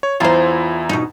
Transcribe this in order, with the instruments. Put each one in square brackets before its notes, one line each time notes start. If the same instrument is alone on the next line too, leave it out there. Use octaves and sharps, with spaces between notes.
[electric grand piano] C#5
[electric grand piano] E2 E4 A#5 [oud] F4 C5
[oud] B2 D#4